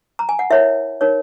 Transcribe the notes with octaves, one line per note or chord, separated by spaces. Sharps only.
A#5
G#5
F#5
E4 A#4 C#5 E5
D#4 A#4 C#5